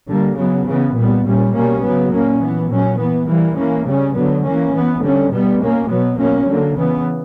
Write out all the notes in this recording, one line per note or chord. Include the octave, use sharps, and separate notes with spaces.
D3 G3 A#3
C#3 F#3 B3
C#3 E3 B3
A#2 G3 B3
A#2 G3 C#4
B2 G3 A#3 C#4
C#3 F#3 B3
A#2 A#3 C#4
E3 B3
A#2 F#3 C#4
E3 B3
E3 G3 A#3
E3 A#3 C#4
C#3 G3 C#4
D3 F#3 B3
E3 A#3 C#4
E3 B3
D3 G3 C#4
B2 G3 B3
B2 A#3 C#4
B2 F#3 B3
B2 F#3 A#3 C#4
D3 F#3 A#3
C#3 E3 B3